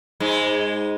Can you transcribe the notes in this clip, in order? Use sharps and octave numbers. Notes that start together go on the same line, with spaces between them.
G#2 G#3